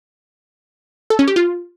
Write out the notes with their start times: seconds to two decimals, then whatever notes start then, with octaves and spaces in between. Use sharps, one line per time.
1.10 A4
1.19 C#4
1.28 G4
1.36 F4